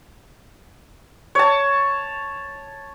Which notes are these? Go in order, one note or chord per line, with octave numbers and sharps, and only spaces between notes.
C#5 A5